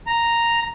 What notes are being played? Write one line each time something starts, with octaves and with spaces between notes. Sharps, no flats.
A#5